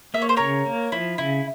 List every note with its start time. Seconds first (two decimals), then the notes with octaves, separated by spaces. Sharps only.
0.14 A#3 E5
0.22 C#5
0.29 C5
0.37 C#3 A#4 C#5
0.66 A#3
0.92 F3 E4
1.18 C#3 E4